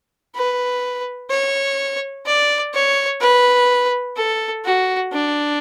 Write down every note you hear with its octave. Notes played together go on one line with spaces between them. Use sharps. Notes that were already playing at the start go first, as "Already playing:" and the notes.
B4
C#5
D5
C#5
B4
A4
F#4
D4